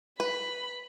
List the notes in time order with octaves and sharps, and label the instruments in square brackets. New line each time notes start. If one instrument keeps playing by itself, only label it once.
[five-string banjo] B4 [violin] B5